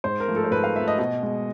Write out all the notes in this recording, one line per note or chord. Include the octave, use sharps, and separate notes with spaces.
G#2 C5
A#4
F3 A3
A4
C5
G#2 B4
F5
F3 A3 E5
D#5
B2 D#5
G#3